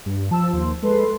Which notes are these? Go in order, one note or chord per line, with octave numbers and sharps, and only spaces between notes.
G2
F3 A5 E6
D#2 C5
G#3 A4 B4 C6